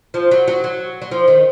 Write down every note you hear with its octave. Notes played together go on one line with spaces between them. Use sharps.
F3
F#3
F#3
F#3
F#3
F3
D#3